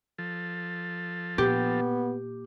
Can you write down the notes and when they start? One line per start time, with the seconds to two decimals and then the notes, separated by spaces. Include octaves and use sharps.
0.18 F3 A4
1.38 A#2 B3 G4